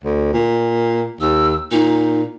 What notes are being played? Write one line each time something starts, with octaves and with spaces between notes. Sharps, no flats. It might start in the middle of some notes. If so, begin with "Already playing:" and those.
D2
A#2
D#2 E6
A#2 D#4